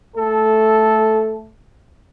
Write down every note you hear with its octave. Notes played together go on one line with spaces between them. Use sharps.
A3 A4